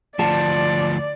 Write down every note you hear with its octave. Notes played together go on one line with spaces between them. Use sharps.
D2 F3 D5 A5